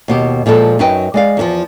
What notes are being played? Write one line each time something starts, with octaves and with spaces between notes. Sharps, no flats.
D#2 B2 G4
A#2 F3 G#3 A4
F#2 F#3 D#4 B4 D#5 G5
G#3 D5 F5
E2 D#3 F3